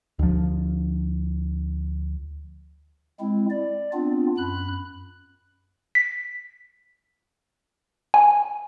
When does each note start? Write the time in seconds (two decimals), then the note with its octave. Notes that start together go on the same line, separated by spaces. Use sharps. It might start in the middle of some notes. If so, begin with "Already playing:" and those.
0.19 D2 F3
3.20 G#3 C4 E4
3.50 D5
3.93 B3 C4 D4 F4
4.38 F#2 B5 F#6
5.95 B6
8.14 G#5